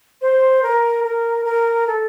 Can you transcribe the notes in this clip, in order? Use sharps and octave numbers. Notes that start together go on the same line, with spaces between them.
C5
A#4
A#4
A#4
A4